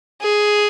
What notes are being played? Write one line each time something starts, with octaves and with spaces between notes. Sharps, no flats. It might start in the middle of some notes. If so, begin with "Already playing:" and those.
G#4